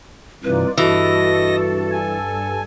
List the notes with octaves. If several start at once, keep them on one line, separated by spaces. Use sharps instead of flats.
G2 C3 E3 D#4 F4 B4 D5
G2 E3 F#4 A4 D#5 A5 A#6
G#5